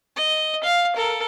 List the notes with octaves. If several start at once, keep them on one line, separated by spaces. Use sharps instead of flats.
D#5
F5
A4 A#4